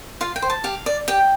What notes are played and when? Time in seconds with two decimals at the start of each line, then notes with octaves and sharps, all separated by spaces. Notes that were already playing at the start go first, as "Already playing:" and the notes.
0.21 F4 F5
0.36 G5
0.42 C5
0.50 A5
0.64 G4 F5
0.86 D5
1.08 G4 G5